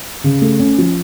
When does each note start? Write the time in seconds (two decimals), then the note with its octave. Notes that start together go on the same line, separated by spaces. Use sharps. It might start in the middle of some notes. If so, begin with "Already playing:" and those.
0.24 C#3
0.42 A3
0.60 C#4
0.78 F3